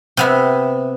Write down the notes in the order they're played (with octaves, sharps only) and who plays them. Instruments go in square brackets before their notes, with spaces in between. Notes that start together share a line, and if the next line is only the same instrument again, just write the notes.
[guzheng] C3 B3 E5